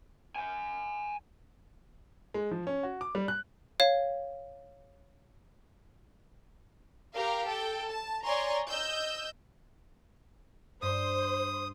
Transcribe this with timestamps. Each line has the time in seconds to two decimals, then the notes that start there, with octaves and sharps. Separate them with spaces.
0.36 F#5 G#5
2.34 G#3
2.51 F3
2.67 C#4
2.83 F#4
3.01 D6
3.15 G3
3.28 F#6
3.80 C#5 F5
7.15 G4 A#4 F5
7.46 A4 G5
7.90 A5
8.24 C#5 D5 G#5 A#5 C6 C#6
8.68 D#5 E6 G6
10.82 G2 C5 D#6